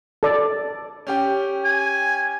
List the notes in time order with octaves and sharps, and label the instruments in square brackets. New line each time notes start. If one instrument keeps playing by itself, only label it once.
[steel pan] A4 D5
[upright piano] C#4 G4 G5
[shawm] G#5